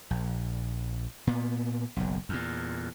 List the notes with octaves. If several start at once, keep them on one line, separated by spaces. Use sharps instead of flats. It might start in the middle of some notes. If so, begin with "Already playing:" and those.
A#1
A#2 B3
F#1 B1
E2 A#2